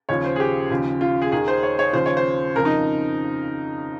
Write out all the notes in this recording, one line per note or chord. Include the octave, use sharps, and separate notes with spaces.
D#2 C#3 F3 C#5
C5
G#4
G4
D#2 C#3 F3
F4
G#4
D#2 D#3 G#4
C5
C#5
C#5
D#2 C#3 F3 C5
C#5
C5
F2 C#3 F3 A#4
D#4